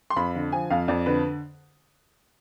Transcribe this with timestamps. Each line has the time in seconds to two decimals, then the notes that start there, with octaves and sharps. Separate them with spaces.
0.10 C6
0.16 F2 B5
0.35 D3
0.52 F3 G#5
0.70 F2 F5
0.88 F2 D5
1.06 D3 B4